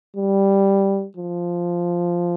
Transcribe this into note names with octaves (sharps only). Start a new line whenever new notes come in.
G3
F3